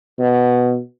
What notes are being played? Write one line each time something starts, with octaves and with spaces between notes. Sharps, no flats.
B2